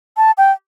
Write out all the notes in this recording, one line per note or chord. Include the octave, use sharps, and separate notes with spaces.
A5
G5